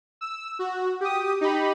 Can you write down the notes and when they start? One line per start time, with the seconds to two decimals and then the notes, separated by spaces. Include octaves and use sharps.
0.21 E6
0.59 F#4
1.01 G4 D#6
1.41 D#4 G4 B5